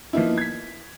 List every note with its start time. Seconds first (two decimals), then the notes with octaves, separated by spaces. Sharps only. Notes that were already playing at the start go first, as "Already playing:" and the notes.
0.13 F3 A#3 B3 D#4 E4
0.38 G#6 B6